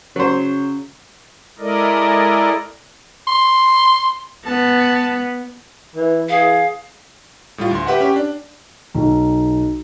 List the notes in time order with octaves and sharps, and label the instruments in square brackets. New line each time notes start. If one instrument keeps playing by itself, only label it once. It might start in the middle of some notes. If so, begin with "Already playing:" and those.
[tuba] C#3 [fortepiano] F#3 C5
[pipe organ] G#3 E4 A4 A#4 D5 D#5
[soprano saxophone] C6
[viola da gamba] B3 [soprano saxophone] A5
[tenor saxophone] E3
[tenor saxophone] E3 [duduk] G#4 [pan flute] F5
[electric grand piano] A2 G3 F4
D2 C6
G4 B4 E5 F#5
C#4 G4
D4
[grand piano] B1